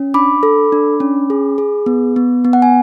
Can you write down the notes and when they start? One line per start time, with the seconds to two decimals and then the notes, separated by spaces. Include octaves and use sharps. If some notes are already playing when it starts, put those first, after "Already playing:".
Already playing: C#4
0.14 D4 B5 D6
0.43 A4
0.72 D4
1.00 C#4
1.30 G#4
1.58 G#4
1.86 B3
2.16 B3
2.45 B3
2.53 F#5
2.62 G#5